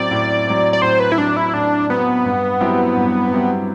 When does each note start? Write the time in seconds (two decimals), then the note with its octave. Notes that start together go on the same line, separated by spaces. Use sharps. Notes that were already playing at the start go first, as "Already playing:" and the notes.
Already playing: A2 F#3 C4 D5
0.11 A2
0.47 F#3 C4
0.73 D5
0.82 A2 C5
1.00 B4
1.12 E4
1.18 F#3 C4 D4
1.37 E4
1.54 A2 D4
1.89 F#3 B3 C4
2.25 G2
2.61 F#3 C4 E4 G4
2.96 G2
3.31 F#3 C4 E4 G4